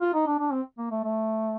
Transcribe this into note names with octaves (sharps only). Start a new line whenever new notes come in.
F4
D#4
D4
D4
C4
A#3
A3
A3